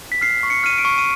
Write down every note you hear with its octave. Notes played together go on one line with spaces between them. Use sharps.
B6
F6 C7
C#6
C#7
F6 D#7
D7
C#6
D#7